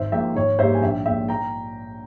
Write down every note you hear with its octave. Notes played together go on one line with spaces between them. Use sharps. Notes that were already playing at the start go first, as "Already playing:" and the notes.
Already playing: G#1 C5 E5
G#2 F3 A#3 E5 G5
G#1 C#5
G#2 G3 A#3 C5 E5
G#5
A#1 E5 G5
A#2 G#3 E5 G5
G5 A#5